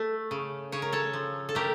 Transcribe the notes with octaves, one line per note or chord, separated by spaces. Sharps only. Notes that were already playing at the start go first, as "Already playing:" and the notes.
Already playing: A3
C#3
C#3 C#5
A#4
A4 C#5
F3
A4
A3 G4 A#4